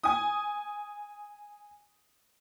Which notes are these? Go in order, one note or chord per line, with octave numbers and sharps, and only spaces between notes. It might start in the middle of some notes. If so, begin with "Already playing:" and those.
G#5 D#6